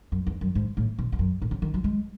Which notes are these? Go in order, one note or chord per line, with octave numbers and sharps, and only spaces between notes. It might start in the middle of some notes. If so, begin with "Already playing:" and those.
F#2
E2
F#2
G#2
A2
B2
E2
F#2
A2
C#3
D#3
F#3
G#3